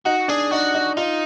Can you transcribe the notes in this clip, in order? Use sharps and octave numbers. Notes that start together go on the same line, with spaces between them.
D#4 F#4
D4 G#4
D#4 F#4
D#4
D#4 F4